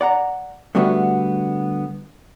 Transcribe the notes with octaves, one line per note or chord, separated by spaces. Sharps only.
D5 F#5 A#5
D3 G3 A3 B3 F#4 E5